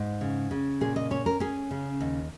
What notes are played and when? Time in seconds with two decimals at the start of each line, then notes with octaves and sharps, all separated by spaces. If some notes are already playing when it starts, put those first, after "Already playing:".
Already playing: G#2
0.21 C#3
0.51 C#3
0.81 A#2 G#4
0.96 D#5
1.11 C#4 C#5
1.26 A#4
1.40 C#4 G#4
1.71 C#3
2.01 D#2